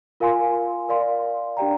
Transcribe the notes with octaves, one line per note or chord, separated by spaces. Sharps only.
F4 A#4 F5 G#5 C6
A#4 D5 F5 C6
D4 G4 D5 G5 A#5